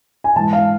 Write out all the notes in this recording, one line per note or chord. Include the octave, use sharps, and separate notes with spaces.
G#5
G#2 E3 A5
F5